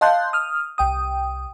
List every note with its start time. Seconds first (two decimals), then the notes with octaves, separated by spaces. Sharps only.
0.01 D#5 F5 A5 C6 F#6 G6
0.33 D#6 F6
0.78 C2 G5 D#6